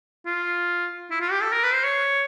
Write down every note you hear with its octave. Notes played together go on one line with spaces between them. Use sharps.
F4
E4
F4
G4
A4
A#4
B4
C5
C#5